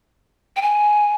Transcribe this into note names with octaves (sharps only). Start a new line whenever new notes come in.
G5
G#5